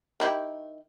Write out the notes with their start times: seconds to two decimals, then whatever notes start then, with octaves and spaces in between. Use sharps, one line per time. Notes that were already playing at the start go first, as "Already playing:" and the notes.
0.20 D#3 E4 G4